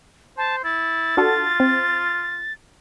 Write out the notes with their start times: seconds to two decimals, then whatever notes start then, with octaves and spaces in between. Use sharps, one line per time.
0.38 C5 A5
0.64 E4 A6
1.17 D4 F4 F#4 A4
1.60 C4